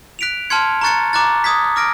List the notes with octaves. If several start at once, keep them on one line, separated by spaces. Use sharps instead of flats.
F#6 B6 D7 F7
A5 C6 F6 G#6 C#7
A#5 C#6 F#6 A6 C#7
A#5 D6 F#6 A6
D#6 G#6 B6
D6 F6 A#6 D7